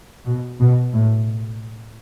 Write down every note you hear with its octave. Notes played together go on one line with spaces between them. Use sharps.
B2
B2
A2